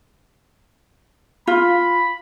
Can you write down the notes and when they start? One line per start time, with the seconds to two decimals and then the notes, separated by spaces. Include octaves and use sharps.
1.47 F4 B5